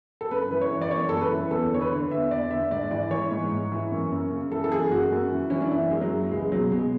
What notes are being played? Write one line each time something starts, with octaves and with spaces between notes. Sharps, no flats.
A4
F#2 B4
E3 B4
C#5
E3
D5
F#2 C#5
F#2 A4
B4
E3
E2 A4
D3 C#5
B4
D3
E2 E5
E2 D5
D3 E5
G#2 D5
E3 D5
E3 C#5
G#2
G#2
E3
F#2
F#2
C#3
E3 A4
A4
F#2 G#4
F#2 F#4
F#2
E3
E3 C#4
D4
F#2 E4
F#2 G#3
F#3
E3
C#2 G#3
B2 F#3
B2 G#3